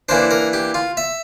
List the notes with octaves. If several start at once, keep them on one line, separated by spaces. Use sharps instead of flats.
E3 A#3 D4 C5
A#4
G4
F4
E5